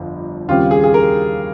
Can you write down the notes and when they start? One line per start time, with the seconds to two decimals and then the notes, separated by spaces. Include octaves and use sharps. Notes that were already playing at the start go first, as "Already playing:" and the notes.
Already playing: G1 F2
0.48 D#2 C#3 G3 C4 F4 G4
0.71 G#4
0.84 G#4
0.94 A#4